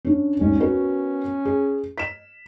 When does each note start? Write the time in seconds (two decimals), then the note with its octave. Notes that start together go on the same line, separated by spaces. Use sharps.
0.05 C#4 D4
0.39 G#1 D#2 C#4
0.60 B3 F#4 A#4
1.45 G#4
1.98 B6 E7